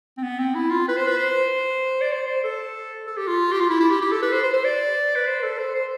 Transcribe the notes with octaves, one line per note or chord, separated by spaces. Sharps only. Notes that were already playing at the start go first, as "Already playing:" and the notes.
C4
B3
C4
E4
F4
B4
C5
B4
C5
D5
C5
C5
A4
A4
G4
F4
G4
F4
E4
E4
G4
G4
A4
B4
C5
C5
C5
D5
B4
C5
A4
C5
C5